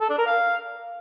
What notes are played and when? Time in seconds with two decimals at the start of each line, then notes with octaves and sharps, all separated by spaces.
0.01 A4
0.10 D4
0.18 A#4
0.27 F5